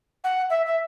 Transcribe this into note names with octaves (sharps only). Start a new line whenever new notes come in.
F#5
E5
E5